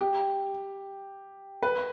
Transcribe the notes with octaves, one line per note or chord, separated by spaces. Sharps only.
G4
B4